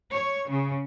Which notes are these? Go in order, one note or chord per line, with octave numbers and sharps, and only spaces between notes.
C#5
C#3